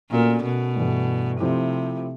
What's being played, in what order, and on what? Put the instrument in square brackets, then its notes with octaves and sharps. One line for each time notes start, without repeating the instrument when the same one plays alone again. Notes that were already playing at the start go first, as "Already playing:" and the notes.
[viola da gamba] A#2 [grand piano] A3 C#4 F#4 A#4 D5
[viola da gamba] B2
[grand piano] G2 E3 A3
[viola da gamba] C3 [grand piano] F3 A3 C4 E4 G4